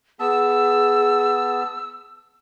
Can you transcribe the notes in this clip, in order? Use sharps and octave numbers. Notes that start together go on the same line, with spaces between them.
B3 G#4 A5 E6